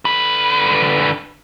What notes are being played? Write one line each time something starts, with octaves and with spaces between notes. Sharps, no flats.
D3 B4